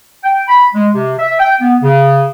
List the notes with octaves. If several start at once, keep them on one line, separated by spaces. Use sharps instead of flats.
G5
B5
G#3
C3
E5
G5
B3
C#3